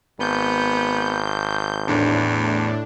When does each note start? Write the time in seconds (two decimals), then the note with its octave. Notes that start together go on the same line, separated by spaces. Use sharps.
0.20 G#1 B3 G6
1.88 E2 A2 D4